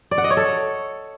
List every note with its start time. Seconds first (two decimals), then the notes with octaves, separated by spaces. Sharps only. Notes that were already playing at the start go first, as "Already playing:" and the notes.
0.11 D5
0.18 F#5
0.24 D#5
0.30 C#5
0.37 A4